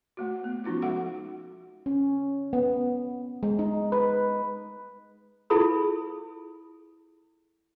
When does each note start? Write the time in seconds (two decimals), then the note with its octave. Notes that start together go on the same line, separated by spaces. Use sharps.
0.17 A3 A#3 F#4
0.44 B3
0.64 F3 C#4 D#4 F4 F#4
0.82 G#3 F#4 A4 F5 F#5
1.86 C#4
2.53 B3
3.43 G#3
3.59 D#4
3.92 B4
5.50 E4 F4 G#4 A4 B5 D#6